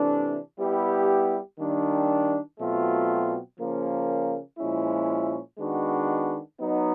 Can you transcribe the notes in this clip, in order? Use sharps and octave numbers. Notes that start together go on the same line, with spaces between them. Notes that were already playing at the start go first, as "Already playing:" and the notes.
Already playing: C3 E3 A3 D4
G3 B3 E4 G4
D#3 G3 A#3 D4
B2 F#3 A3 C4 F4
C#3 F3 A#3 C#4
A#2 F3 G#3 C#4 E4
D#3 G#3 B3 D4 F#4
F#3 B3 D#4